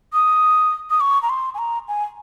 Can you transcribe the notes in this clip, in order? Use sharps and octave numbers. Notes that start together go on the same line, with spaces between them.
D#6
D#6
C#6
A#5
C6
G#5
A#5
G#5